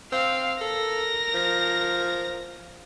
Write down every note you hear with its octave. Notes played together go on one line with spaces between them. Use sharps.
C4 F5
A4 A#4 A#6
F3